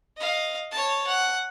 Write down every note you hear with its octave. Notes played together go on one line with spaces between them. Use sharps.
D#5 F5
C#5 A5
F#5